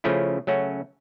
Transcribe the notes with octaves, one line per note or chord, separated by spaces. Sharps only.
C#3 F3 A3 C#4 E4
C#3 F#3 A3 C#4 F#4